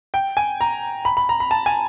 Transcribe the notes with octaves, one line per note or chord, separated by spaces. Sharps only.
G5
G#5
A#5
B5
B5
A#5
B5
A5
G#5